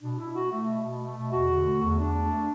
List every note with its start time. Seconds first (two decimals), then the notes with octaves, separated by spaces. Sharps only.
0.01 B2 D4
0.18 B2 E4
0.34 A3 F#4
0.51 A3
0.67 B2
0.84 B2
1.00 A3
1.17 B2
1.32 E2 F#4
1.50 D3
1.66 A3
1.83 E2
1.99 E2 D4
2.15 A3
2.31 A3